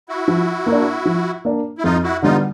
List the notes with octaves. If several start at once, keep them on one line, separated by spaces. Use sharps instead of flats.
E4 F#4
F3
A#3
D4
F3
A#3 D4
E4
F2 D#4 F4
E4 F#4
D3 G3 B3 D#4 F4